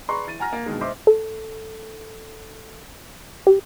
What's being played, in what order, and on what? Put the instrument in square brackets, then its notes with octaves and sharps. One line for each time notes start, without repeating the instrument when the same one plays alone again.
[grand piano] G#4 B4 D5 A#5 C6 C#6
E3 A6 D#7
F#5 G#5 A#5 F6 A#6
A#3
G2 B2 D#3 G#3
C5 D#5 E5 C6 D6
[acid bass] A4
G4